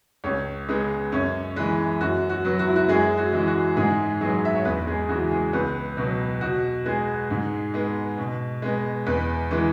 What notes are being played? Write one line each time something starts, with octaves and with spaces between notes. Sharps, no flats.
C#2 C#4 C#5
C#3 G#3 B3
F#2 C#4 C#5
E3 G#3 B3 B4
F#2 F#4
F#4
F#3 B3
F#4
E4
F#4
F#2 G#3 G#4
F#4
E3 G#3
F#4
G#2 G#3 G#4
F#3 G#3 B3 G#4
E5
C#5
E2 B3 B4
G#3 G#4
C#3 E3 F#4
G#3 G#4
C#2 B3 B4
B2 F#3 B3
B2 F#4
G#3 B3 G#4
G#2
G#3 B3
B2
G#3 B3
E2 B3 B4
E3 G#3 B3